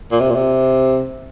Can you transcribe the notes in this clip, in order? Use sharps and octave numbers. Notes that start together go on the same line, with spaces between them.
A#2
C3
A#2
C3